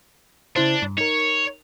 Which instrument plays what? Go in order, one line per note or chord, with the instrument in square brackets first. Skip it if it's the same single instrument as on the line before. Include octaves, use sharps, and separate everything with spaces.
[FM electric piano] C#3 E4 C5 [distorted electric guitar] D4
[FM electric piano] G2
[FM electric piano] D#4 A#4 [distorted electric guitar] C#5